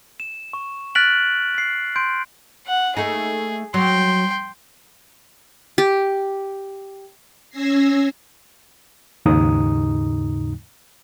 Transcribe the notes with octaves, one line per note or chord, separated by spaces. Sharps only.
E7
C#6
F6 F#6 A6 B6 D7 F#7
B6 C7
C6 G6 D7
F#5
A3 A#3 D#4 G#4
F#3 G5 C6
G4
C#4 E6 G#6 A#6 C7
D#2 G#2 C#3 D#4 A#5 D#6